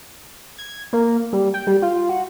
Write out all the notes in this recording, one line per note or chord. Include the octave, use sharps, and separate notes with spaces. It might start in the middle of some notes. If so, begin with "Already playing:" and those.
G#6
A#3
G3
G5
G3
F4
F#4